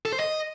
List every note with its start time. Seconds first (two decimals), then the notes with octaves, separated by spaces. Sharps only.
0.05 A4
0.12 C5
0.20 D#5